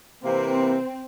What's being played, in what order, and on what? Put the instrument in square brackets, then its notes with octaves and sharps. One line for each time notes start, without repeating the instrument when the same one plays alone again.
[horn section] C3 E3 A#3 [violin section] C4